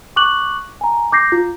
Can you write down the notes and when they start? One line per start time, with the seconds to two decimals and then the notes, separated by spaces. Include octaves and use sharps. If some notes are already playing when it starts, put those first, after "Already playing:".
0.16 C#6 D6 F#6 F#7
0.81 G#5 A#5
1.12 D6 G6 A#6 C7
1.32 F4